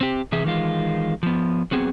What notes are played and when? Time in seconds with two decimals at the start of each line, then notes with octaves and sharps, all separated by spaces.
0.01 C4 G4
0.32 C3 E3 G#4 E5
0.44 D#3 E3 G#3 F4
1.23 F3 B3
1.71 F#3 B3 C4 G#4